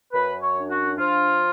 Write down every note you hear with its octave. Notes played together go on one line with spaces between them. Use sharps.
F#2 B4
C#5
D4
F#4
F3 F4